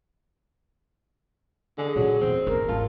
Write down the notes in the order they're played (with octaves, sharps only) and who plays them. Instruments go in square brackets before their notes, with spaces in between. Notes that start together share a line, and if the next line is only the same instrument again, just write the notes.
[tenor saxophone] D3 [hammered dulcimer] G#4 D#5
[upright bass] A#2 [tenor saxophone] F#3
[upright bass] E2 [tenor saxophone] C4
[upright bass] E4 [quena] A#4
[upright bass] G#1 [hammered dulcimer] G3 A4 [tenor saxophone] F4